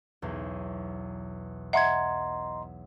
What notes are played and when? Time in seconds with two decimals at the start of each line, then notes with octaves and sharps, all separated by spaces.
0.22 B1 E2
1.73 D#5 E5 F#5 A#5 C6 G#6